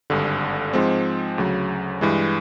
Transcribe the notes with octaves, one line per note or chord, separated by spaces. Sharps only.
G#1 G2 D3
G#2 F3 G#3 C4
D2 C#3 F#3
G2 E3 G#3